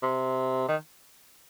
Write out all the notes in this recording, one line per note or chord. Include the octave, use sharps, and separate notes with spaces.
C3
D#3